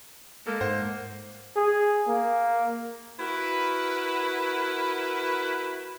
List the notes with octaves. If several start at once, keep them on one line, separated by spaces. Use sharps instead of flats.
G#3 A#3 A4
G#2 C5 F#5
G#4
A#3
E4 F#4 A#4 B4